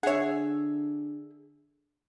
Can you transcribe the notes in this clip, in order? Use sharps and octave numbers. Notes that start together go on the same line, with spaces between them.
D3 G#4 C#5 E5 F#5